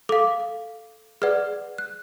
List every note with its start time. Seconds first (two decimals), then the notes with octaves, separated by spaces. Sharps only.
0.09 A4 F5 D6
1.22 G#4 B4 D5 F#5 F6
1.78 F#6